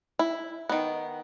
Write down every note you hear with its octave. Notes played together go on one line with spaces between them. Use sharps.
E4
D#3 B3